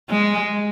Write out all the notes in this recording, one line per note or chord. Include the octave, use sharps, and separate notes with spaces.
G#3